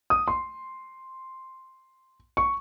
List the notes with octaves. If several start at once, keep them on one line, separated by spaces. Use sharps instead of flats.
D#6
C6
C#6